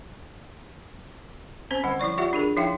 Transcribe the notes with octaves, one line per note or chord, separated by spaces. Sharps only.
C4 C#4 C5
D3 G3 F#5
F3 E4 D5 C#6
F4 G4 D5 E5 F#5
D4 G#4 A#4
F3 D#4 E4 E5 F5 G5